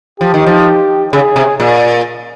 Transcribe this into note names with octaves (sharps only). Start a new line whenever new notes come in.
F3 G4
D#3
F3
C#3 G#4
C3
A#2